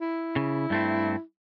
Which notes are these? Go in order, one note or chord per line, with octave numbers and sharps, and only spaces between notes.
E4
C#3
G2 A3 C4